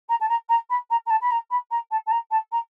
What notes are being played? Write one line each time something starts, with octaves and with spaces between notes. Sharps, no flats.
A#5
A5
A#5
A#5
B5
A#5
A#5
A5
B5
A#5
B5
A#5
A5
A5
A#5
A5
A#5